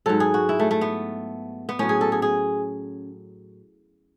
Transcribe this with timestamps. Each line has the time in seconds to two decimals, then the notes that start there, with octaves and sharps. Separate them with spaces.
0.06 G#2 F#3 A4
0.20 G#4
0.34 F#4
0.49 E4
0.60 A3
0.71 A3
0.81 B3
1.69 B3
1.79 A2 F#3 C#4
1.89 G#4
2.01 A4
2.12 G#4
2.22 G#4